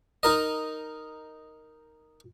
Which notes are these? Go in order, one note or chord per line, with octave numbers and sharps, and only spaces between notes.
D#4 A#4 D#5